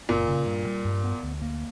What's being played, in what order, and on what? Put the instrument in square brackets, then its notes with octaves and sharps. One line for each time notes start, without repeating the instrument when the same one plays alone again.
[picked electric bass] F#1 [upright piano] A#2
[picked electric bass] C#3
G2
G3
G2
B3
D2
A#3